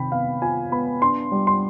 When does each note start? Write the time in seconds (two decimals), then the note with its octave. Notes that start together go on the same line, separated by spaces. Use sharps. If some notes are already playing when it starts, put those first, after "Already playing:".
Already playing: C3 D#3 G5 B5
0.12 B3 F5
0.42 F4 G#5
0.72 B3 B5
1.02 D4 C6
1.32 G3
1.47 C6